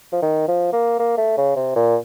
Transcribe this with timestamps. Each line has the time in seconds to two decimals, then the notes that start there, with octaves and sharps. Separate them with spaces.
0.12 F3
0.22 D#3
0.48 F3
0.73 A#3
0.99 A#3
1.18 A3
1.38 C#3
1.56 C3
1.76 A#2